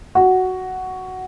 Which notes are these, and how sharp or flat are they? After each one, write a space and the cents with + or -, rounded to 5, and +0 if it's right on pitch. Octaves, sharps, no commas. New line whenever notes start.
F#4 +5